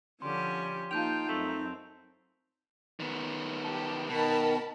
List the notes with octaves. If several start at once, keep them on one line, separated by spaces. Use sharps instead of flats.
D3 F3 G3 C#4 G4 C6
A#3 D#4 F4 G5 A5 G6 F7
F#2 A3 C4 E7
D#3 B3
G4 A5
B2 D#3 A#4 A5 B5